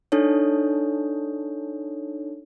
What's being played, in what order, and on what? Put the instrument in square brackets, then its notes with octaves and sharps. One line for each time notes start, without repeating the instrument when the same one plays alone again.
[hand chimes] D4 D#4 A4 C#5